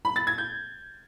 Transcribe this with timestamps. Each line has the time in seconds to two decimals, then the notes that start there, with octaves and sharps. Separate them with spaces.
0.05 B5
0.16 A6
0.27 G#6
0.38 G6